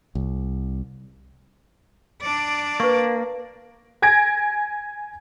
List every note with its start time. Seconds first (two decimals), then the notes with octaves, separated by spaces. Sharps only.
0.15 C2
2.22 D4 D5
2.80 A#3 B4 C#6
4.02 G#5 G#6 A#6 D7